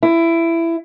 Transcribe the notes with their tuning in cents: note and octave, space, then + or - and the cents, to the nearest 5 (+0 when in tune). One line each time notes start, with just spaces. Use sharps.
E4 +15